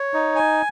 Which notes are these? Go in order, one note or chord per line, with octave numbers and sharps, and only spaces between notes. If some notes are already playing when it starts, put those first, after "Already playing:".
Already playing: C#5
D#4
G#5